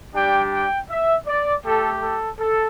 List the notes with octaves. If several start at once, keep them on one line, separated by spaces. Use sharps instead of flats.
G3 D4 G4 G5
G5
E5
D5
A3 G4 A4
A4
A4